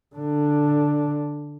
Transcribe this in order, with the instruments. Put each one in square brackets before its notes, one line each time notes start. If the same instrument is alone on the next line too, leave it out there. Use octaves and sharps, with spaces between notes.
[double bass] D3 D4